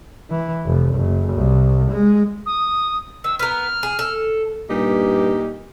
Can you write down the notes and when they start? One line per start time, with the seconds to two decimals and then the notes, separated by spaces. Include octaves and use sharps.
0.30 E3
0.67 F1
0.96 F#1
1.34 C2
1.91 G#3
2.46 D#6
3.24 D#3 E6
3.39 B3 A#4 F6
3.83 G#4
3.99 A4
4.70 G2 A#2 D#4 G4